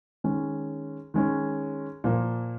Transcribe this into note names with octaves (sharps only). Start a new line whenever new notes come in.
D#3 G#3 C#4
D#3 G#3 C#4
A#2 F3 A#3